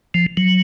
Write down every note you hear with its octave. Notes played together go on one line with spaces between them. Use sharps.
F3
F#3